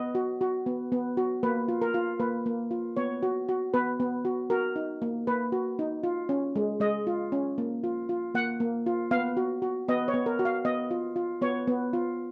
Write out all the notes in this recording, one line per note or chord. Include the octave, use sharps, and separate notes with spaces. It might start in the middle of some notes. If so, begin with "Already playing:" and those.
Already playing: B3 D#5
F#4
F#4
B3
B3
F#4
A#3 B4
F4
A#4
F4
A#3 B4
A#3
F4
B3 C#5
F#4
F#4
B3 B4
B3
F#4
F#4 A#4
D#4
A#3
A#3 B4
F#4
D#4
F4
C#4
G#3
G#3 D#5
F4
C#4
A#3
F4
F4
A#3 F#5
A#3
F4
B3 F5
F#4
F#4
B3 D#5
C#5
B3
A#4
F#4
F5
B3 D#5
F4
F4
B3 C#5
B3
F4